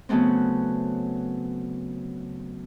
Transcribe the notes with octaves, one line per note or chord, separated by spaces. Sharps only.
C#3 F#3 A3 B3 C4